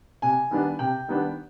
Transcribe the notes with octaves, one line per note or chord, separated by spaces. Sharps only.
C3 G#5
D#3 G3 B3 D4
C3 G5
D#3 G3 B3 D4